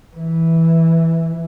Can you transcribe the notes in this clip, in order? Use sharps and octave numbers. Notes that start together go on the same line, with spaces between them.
E3